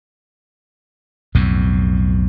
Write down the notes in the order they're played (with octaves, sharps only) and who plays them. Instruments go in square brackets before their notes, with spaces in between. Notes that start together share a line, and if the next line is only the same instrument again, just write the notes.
[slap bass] B1 F2 A2